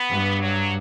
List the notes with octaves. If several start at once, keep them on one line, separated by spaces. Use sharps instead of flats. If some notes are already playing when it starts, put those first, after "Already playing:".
Already playing: B3
G2
F#3